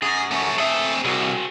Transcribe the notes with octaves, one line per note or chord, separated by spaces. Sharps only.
F#2 G#4
A3 C#4
C4 G#4 A4 E5
C2 F#4 G#4